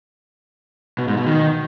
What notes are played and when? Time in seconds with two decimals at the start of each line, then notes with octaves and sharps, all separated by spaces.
0.98 B2
1.08 G#2
1.17 B2
1.27 D#3